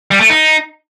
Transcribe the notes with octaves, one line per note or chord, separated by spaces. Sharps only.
G3
A3
D#4